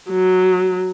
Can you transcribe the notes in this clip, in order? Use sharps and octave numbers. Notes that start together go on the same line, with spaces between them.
F#3